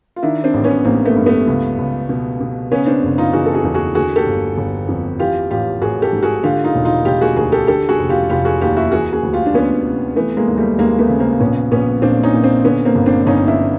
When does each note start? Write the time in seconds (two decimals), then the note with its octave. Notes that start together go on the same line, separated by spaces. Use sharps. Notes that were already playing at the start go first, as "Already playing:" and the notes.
0.16 F4
0.23 D#3 D4 E4
0.44 C4 D4
0.54 A1
0.64 B3 C#4
0.85 A1 A#3 C4
1.05 A3 B3
1.16 G2
1.26 A3 B3
1.47 C#2
1.78 C#2
2.09 B2
2.41 B2
2.71 C#3 B3 C#4
2.86 C4 D4
3.03 F#1
3.18 D#4 F4
3.33 E3 F#4 G#4
3.46 A4
3.54 F#4 G#4
3.64 E2
3.74 F#4 G#4
3.95 D3 F#4 G#4
4.16 G4 A4
4.26 G1
4.58 G1
4.89 F2
5.19 E3 F4 G4
5.51 A1 F4 G4
5.81 A1 F#4 G#4
6.02 G4 A4
6.13 G#2
6.23 F#4 G#4
6.44 D3 F4 G4
6.64 D#4 F4
6.75 E1
6.85 D#4 F4
7.05 E1 F4 G4
7.21 F#4 G#4
7.37 D2 F#4 G#4
7.52 G4 A4
7.67 D3 G4 A4
7.89 F#4 G#4
7.99 F1
8.10 F4 G4
8.30 F1 F4 G4
8.45 F#4 G#4
8.61 D#2 F4 G4
8.77 E4 F#4
8.92 E3 F#4 G#4
9.13 F#4 G#4
9.23 D2
9.33 F4 G4
9.46 D4
9.54 D2 B3 C#4
9.85 C3
10.16 E3 A3 B3
10.37 G#3 A#3
10.47 D#2
10.58 G3 A3
10.78 D#2 G#3 A#3
10.99 A3 B3
11.09 C#3
11.19 A#3 C4
11.40 A#1 B3 C#4
11.71 A#1 B3 C#4
12.02 A#2 C4 D4
12.23 C#4 D#4
12.34 A#2
12.44 C4 D4
12.65 D3 B3 C#4
12.85 A#3 C4
12.95 G1
13.06 C4 D4
13.27 G1 C#4 D#4
13.47 D4 E4